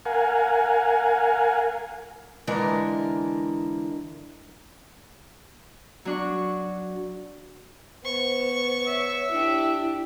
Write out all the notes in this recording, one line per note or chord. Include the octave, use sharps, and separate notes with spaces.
A#4 F5 F#5 G#5
D3 E3 G#3 A#4
F#3 D4 C#6
B3 C5 C#6
C#5 E5
D4 E4 G4